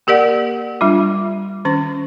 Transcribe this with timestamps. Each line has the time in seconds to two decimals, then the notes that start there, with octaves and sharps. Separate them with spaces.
0.07 A#3 G4 A#4 D5 F#5
0.81 G3 D4 F4
1.65 D#3 C#4 C#6